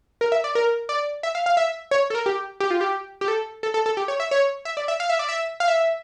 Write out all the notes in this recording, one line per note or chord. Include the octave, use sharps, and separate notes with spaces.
A#4
E5
D5
A#4
D5
E5
F5
F5
E5
C#5
A4
A#4
G4
G4
F4
G4
G4
A4
A4
A4
A4
G4
C#5
E5
C#5
E5
D5
E5
F5
E5
D5
E5
F5
E5